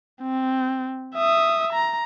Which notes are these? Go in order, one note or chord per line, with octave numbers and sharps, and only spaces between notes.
C4
E5 D#6
A#5